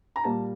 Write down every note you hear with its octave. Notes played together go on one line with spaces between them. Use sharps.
A#5
A#2 G3 A#3 A5